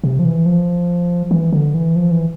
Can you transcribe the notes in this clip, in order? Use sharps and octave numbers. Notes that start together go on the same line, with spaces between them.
C3
F3
E3
F3
E3
D3
E3
F3
E3